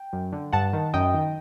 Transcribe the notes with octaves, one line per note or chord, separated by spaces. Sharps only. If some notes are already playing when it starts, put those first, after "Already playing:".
Already playing: G5
F#2
D3
G2 F#5 A5
D#3
F#2 D#5 G5
D#3